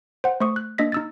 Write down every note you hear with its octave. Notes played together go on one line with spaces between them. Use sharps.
C5 F#5
A3 C5 C#6 D#6
F#6
A#3 D4 D#5 A#6 B6
D#4 E6 A6